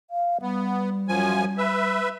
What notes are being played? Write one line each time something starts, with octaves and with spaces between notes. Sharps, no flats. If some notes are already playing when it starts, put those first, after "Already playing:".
F5
G3 B3
F#2 F3 G#5
B4 E5